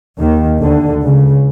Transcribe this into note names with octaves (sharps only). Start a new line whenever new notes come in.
D#2 D#3
D2 D3
C#2 C#3